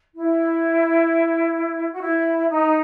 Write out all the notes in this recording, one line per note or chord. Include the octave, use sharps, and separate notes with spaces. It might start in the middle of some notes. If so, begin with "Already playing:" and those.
E4
F#4
E4
D#4